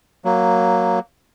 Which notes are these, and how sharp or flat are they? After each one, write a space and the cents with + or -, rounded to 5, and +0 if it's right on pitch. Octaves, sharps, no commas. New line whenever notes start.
F#3 +5 A#3 +0